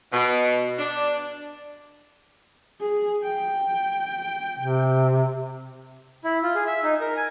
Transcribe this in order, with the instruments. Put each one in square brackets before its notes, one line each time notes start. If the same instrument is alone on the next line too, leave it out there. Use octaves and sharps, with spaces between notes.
[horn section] B2
D4
[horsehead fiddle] G#4
G5
[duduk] C3
[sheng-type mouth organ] E4
F4
G#4
E5
D#4
A#4
G#5